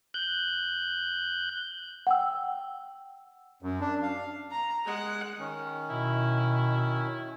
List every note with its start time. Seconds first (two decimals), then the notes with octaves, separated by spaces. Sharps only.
0.14 F#6 G6
2.07 F#5 G5 E6
3.63 F#2
3.81 D4
4.02 F5
4.51 A#5
4.85 G#3 F#5
5.39 D#3 C#4
5.90 B2 E4